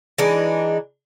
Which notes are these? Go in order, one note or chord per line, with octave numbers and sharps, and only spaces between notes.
E3 G#3 D4 D#4